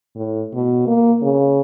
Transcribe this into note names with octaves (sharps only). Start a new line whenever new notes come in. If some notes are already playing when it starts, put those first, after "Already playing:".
A2
B2
A#3
C#3